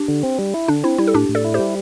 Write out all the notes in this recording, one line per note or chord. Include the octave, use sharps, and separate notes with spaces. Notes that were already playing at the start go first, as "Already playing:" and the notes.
Already playing: D4 G4
D3
C4
G3
E4
D3 D4
C4 E4
G3 E4
A4
A2 D4 G4
A2
A4 D5
E4
G4 C5
G3